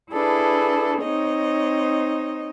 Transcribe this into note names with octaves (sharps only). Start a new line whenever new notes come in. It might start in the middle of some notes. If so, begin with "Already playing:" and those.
D4 E4 G#4 A4 B4
C4 D#4 C#5 D#5